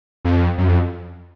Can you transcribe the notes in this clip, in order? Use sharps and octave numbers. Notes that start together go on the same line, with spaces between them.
F2
F#2
F2